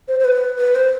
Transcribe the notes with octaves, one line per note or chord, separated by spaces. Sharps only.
C5
C5
B4
B4
C5